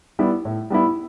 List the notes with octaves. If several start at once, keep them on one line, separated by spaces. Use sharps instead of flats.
G3 B3 E4
A2
G3 B3 E4